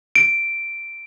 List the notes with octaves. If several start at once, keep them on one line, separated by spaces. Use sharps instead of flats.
D7